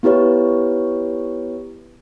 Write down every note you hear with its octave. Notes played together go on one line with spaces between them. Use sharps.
B3 E4 G4 B4 C#5